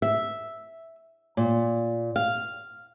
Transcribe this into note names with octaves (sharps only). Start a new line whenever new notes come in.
E5
A#2
F5